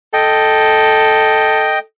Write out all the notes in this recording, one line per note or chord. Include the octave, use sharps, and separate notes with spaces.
A4 D#5 G5